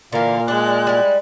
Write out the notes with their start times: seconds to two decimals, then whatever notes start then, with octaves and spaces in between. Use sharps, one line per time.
0.12 A#2 D3 E3 A#4 F5
0.48 G#3 D4 F#6
0.87 G3 E4